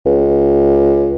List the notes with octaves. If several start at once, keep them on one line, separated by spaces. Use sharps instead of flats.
C#2